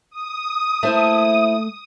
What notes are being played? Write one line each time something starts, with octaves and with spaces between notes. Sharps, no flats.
D#6
A3 A#3 E4 C5 E5